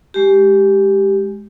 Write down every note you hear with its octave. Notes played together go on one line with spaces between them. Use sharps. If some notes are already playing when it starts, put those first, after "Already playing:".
G#3 G4